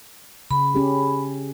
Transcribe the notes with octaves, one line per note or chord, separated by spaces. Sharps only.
C#3 B5
C#4 G4 G#4